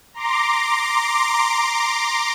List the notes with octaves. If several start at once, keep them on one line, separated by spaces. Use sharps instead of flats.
A#5 C6 D6